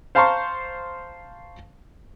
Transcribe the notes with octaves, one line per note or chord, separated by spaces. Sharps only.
C5 F5 A5 A#5 C6 C#6